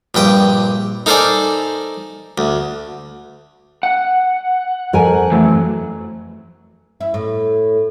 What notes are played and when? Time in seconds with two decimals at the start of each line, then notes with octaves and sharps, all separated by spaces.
0.14 A#1 G2 G5 D#6
1.06 D#4 A4 A#4 C5 D5 G#5
2.38 D2
3.83 F#5
4.93 F2 A#4 G#5
5.32 E3 F#3 A3
7.01 E4
7.14 A2